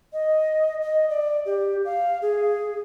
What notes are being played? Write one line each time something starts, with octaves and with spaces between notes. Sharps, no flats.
D#5
D#5
D5
G4
F5
G#4